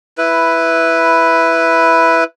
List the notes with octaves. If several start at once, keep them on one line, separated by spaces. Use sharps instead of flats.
E4 B4